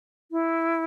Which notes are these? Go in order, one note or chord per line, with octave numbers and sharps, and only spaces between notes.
E4